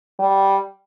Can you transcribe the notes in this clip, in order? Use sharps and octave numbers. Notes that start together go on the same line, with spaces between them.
G3